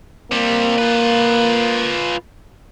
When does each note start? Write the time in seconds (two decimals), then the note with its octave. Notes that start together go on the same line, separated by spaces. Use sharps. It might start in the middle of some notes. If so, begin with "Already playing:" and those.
0.32 C3 G3 A#3
0.78 F4 B4